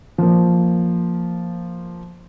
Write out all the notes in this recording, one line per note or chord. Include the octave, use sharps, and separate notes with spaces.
F3 A#3